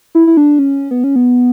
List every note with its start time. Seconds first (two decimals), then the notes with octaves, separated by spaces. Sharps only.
0.15 E4
0.27 E4
0.37 D4
0.59 C#4
0.91 B3
1.04 C#4
1.16 B3